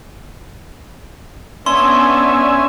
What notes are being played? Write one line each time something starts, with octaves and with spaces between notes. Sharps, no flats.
B3 C#4 D4 E5 G#5 C6